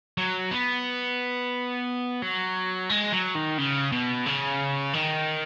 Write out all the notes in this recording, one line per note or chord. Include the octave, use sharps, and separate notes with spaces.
F#3
B3
F#3
G#3
F#3
D#3
C#3
B2
C#3
D#3